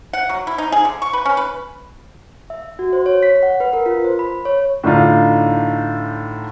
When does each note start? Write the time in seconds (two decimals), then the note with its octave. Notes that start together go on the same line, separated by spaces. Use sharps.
0.13 F#5
0.29 F#3
0.47 E4
0.58 D#4
0.72 G#4
0.85 D3
1.02 C#6
1.13 B4
1.25 C#4
1.37 B4
2.50 E5
2.79 F#4
2.93 C5
3.06 C#5
3.23 B6
3.43 F#5
3.60 B4
3.73 A#4
3.86 F4
4.04 C5
4.19 B5
4.45 C#5
4.84 A2 D3 D4 D#4 F4